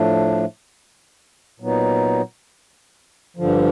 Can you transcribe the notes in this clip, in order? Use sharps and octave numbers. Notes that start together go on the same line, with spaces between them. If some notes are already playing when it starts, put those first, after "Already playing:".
Already playing: A2 F3 A3 D4
A#2 F#3 B3 D#4
G2 D3 F3